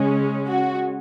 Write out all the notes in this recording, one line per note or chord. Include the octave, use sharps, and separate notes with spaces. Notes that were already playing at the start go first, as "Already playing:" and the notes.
Already playing: C#3 G#3 C#4
F#4